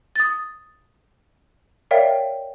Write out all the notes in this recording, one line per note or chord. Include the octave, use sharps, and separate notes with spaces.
D#6 A6
A#4 C#5 D5 E5 F5 G5